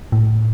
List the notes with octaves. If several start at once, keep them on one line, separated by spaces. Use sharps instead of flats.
A2